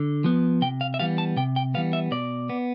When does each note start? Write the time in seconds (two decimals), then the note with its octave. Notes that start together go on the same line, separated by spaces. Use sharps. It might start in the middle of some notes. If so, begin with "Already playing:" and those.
Already playing: D3
0.24 F3 B3
0.62 C3 G5
0.81 F5
0.94 E5
1.00 E3 G3 B3 F5
1.18 A5
1.37 C3 G5
1.56 G5
1.74 E3 G3 B3 F5
1.93 E5
2.11 B2 D5
2.49 B3